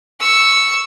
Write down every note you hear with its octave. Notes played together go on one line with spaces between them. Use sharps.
C#6 E6